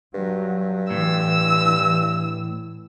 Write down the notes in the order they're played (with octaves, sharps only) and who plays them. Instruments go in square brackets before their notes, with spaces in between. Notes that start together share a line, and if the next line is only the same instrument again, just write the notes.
[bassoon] G2 [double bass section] F#3
[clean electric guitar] A2 [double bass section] E3 [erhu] E6